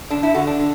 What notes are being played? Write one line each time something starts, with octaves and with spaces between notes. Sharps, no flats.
D3 D4
E4
D3 F#4
D4
D3